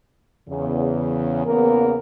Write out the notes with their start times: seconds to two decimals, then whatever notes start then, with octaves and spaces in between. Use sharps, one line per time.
0.49 E2 C#3
1.46 E2 C#3 A#3 B3 A#4